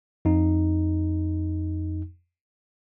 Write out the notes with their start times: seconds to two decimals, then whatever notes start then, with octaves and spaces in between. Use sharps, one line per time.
0.25 F2 D#4